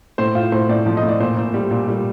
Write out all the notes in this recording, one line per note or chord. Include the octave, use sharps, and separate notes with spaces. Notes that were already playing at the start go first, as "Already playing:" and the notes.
A2 C5
A2 F4
A2 C5
A2 D5
F3
D#5
A2 D5
A#2 C5
A#2
G3
A#2
G3